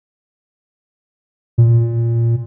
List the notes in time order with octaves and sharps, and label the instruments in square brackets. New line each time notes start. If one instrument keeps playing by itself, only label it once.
[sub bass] A#2